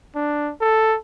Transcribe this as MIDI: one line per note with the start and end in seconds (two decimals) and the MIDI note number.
0.15 0.53 62
0.61 0.97 69